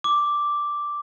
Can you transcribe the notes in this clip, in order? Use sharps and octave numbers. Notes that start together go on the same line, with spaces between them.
D6